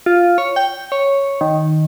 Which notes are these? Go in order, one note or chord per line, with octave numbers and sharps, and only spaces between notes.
F4
C#5
G5
C#5
D#3